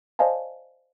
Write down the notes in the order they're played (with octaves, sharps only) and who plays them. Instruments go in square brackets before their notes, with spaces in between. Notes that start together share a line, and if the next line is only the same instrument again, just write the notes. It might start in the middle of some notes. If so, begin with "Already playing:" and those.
[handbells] C5 D5 D#5 F5 G#5 A5